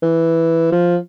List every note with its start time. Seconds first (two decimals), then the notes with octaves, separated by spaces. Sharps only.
0.02 E3
0.72 F3